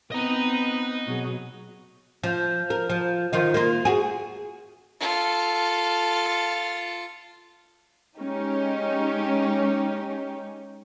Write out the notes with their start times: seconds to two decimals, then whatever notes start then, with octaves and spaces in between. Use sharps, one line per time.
0.12 B3 C4 B4 D#5 A#5
1.07 B2 F#3 F#4 G#4
2.24 F3
2.70 A#4
2.90 F3
3.33 D#3 F3 F4
3.54 A#3 F4
3.85 F#4 G#4
5.00 F4 A4
8.19 G#3 C#4 D#4 G4